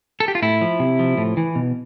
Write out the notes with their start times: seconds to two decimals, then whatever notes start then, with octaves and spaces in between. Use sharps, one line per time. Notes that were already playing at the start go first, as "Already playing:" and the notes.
0.20 A4
0.28 G4
0.35 F4
0.42 A2 E4
0.61 F3
0.80 C3
0.99 F3
1.18 A2
1.37 E3
1.55 B2